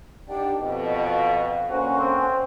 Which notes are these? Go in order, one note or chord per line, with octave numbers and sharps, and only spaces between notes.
D#3 D4 G4 F#5 G5
F2 B2 D#5
F5 C#6
D3 A#3 C#4 F#4 C5 G#5
C4